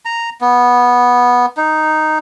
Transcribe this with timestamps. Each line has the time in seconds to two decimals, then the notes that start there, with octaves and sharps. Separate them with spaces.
0.05 A#5
0.41 B3
1.57 D#4